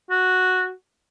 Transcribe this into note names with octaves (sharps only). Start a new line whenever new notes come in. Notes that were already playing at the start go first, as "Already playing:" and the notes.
F#4